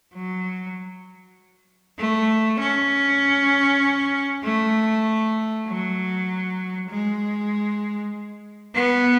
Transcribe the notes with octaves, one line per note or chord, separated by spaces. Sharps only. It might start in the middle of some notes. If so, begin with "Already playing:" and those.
F#3
A3
C#4
A3
F#3
G#3
B3